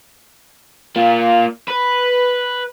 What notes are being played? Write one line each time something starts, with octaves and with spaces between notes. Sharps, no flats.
A#3 F4
B4